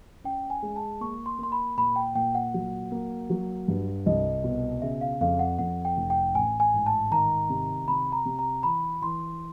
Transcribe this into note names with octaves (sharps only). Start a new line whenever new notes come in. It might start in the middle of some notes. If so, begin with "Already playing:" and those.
C#4 G5
G#5
G#3
A5
A#3 C#6
C6
A#3 C6
B5
A#2 B5
G5
A#2 G5
F#5
F#3
A#3
F#3
G2
C2 D#5
B2
C#3 E5
F5
F2 F5
F#5
F2 F#5
G5
F1
G5
A1 G#5
G#5
G#2
A5
D#3 A#5
C3
C3 B5
A#5
C3
A#5
E3 B5
E3 C6